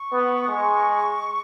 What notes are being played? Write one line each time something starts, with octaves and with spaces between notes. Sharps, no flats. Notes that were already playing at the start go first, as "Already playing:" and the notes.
Already playing: C#6
B3
G#3